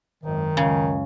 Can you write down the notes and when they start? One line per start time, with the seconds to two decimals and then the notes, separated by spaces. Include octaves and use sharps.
0.24 G#1 F#2 D#3
0.57 C#2 F#2 C#3